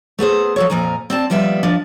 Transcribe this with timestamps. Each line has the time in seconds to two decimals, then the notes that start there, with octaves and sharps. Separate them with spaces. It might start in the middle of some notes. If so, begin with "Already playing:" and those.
0.19 A3 B3 G#4 C5
0.56 F3 A4 C#5
0.70 F2 A#2 F3 G#5 A#5
1.10 C4 D5 A5
1.30 D#2 F3 G3 B3 E5
1.63 D#2 F3 D4